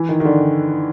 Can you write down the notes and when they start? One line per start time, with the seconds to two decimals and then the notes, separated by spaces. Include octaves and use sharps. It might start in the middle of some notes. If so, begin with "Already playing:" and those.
Already playing: E3
0.09 D#3
0.20 D#3
0.25 D3